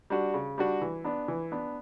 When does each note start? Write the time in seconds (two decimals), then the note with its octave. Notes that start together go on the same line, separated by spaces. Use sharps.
0.10 G3 D4 F#4
0.34 C#3
0.58 G3 D4 F#4
0.81 E3
1.04 B3 D4
1.28 E3
1.52 B3 D4